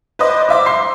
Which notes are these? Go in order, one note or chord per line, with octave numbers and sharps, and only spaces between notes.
B4 C5 D5 D#5
C5 E5 D6
C6 C7